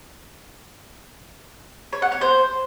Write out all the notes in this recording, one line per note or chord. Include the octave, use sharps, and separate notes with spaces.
C#5
F#5
C#5
C5